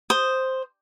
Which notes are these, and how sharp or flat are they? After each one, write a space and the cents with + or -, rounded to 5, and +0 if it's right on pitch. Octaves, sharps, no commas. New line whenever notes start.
C5 +0 D#6 +0